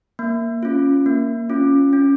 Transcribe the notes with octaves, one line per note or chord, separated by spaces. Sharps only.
A#3
C#4 F4
A#3
C#4 F4
C#4